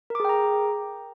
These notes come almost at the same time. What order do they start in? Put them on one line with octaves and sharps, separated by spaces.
A#4 D6 G#4 G5 A#5